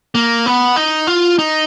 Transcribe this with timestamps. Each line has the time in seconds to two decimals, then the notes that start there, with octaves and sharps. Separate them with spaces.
0.15 A#3
0.46 B3
0.76 D#4
1.07 F4
1.39 D#4